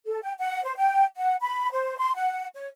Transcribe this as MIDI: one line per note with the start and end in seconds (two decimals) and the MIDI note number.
0.06 0.20 69
0.22 0.33 79
0.38 0.63 78
0.64 0.74 72
0.76 1.04 79
1.16 1.35 78
1.41 1.71 83
1.72 1.96 72
1.98 2.15 84
2.15 2.46 78
2.55 2.67 73